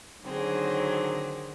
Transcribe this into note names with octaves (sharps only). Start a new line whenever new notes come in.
D3 D#3 F#3 C4 G#4